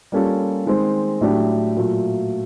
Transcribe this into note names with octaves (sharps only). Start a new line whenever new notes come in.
G3 A#3 C#4 F4 A4
D#3 G#3 C4
A2 F#3 A3 D4 G4
A#2 F#3 A3